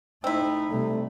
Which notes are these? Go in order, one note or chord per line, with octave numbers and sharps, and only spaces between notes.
A3 C4 D#4 E4
C3 G3 A3